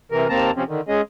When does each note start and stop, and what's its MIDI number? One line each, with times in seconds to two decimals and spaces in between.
0.12 0.28 48
0.12 0.28 52
0.12 0.28 70
0.29 0.51 39
0.29 0.51 58
0.29 0.51 60
0.29 0.51 81
0.29 0.51 82
0.56 0.64 48
0.56 0.64 53
0.56 0.64 60
0.56 0.64 61
0.68 0.81 50
0.68 0.81 51
0.88 1.01 56
0.88 1.01 61
0.88 1.01 68
0.88 1.01 75